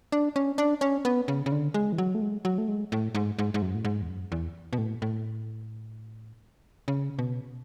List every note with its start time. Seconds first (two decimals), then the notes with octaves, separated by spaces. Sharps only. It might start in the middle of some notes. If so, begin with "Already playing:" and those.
0.12 D4
0.36 C#4
0.58 D4
0.81 C#4
1.05 B3
1.28 C#3
1.46 C#3
1.52 D3
1.74 G#3
1.93 E3
1.98 F#3
2.15 A3
2.21 G#3
2.45 F#3
2.58 A3
2.68 G#3
2.92 A2
3.15 G#2
3.39 G#2
3.54 G#2
3.62 F#2
3.74 A2
3.85 G#2
4.02 E2
4.09 F#2
4.32 E2
4.73 B2
4.78 A2
5.02 A2
6.88 C#3
7.19 B2